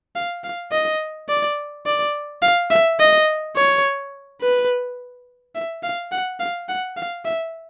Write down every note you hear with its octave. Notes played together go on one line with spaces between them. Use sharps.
F5
F5
D#5
D5
D5
F5
E5
D#5
C#5
B4
E5
F5
F#5
F5
F#5
F5
E5